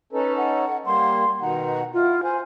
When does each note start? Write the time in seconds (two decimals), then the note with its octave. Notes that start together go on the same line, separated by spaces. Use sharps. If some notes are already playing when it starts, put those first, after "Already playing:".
0.13 C#4 D#4 A4 B4
0.37 F#5
0.86 G3 A#3 C6
1.41 B2 D#3 D#4 F#5
1.94 E4 F4
2.23 C5 G#5